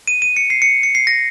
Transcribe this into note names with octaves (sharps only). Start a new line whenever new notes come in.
D#7
D#7
C#7
C7
C#7
C#7
C7
A#6